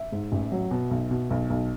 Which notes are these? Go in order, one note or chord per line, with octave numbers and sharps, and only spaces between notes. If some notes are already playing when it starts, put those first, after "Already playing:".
Already playing: E5
G#2
A1
F#3
B2
B1
B2
B1
B1